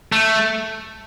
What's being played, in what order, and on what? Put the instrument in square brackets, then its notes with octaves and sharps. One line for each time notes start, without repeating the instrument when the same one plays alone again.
[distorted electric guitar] A3